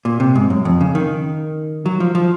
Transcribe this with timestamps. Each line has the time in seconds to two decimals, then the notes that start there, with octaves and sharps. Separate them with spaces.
0.05 A#2
0.20 C3
0.35 G#2
0.50 F#2
0.65 F2
0.81 C#3
0.95 D#3
1.86 F#3
2.00 F3
2.15 F3